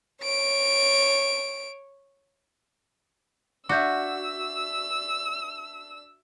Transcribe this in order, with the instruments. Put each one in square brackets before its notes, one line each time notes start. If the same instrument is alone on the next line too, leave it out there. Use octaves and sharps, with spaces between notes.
[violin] C#5 D7
[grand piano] D4 E5 [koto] F#4 [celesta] D6 G6 [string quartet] E6